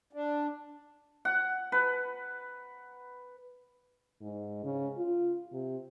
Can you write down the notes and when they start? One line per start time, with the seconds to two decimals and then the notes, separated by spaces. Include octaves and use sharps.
0.13 D4
1.25 F#5
1.72 B4
4.21 G#2
4.64 C#3
4.98 F4
5.53 C3